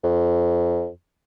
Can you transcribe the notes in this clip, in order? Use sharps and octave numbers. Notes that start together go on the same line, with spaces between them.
F2